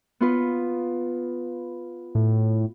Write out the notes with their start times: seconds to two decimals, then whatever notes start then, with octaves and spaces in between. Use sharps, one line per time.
0.21 B3 F4 B4
2.15 A2